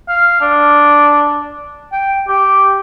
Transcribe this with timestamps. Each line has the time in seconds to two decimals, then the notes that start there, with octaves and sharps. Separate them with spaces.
0.08 F5
0.41 D4
1.92 G5
2.28 G4